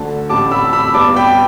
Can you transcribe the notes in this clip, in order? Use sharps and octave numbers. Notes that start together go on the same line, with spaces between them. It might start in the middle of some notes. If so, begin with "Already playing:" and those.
Already playing: D2 D3 A3 A5
A1 A2 G3 A5 D6
B5 E6
B5 E6
G2 G3 B3 A5 D6
G5 B5